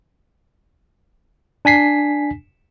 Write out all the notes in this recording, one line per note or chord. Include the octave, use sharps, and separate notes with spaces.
D4 G#5 B6 C7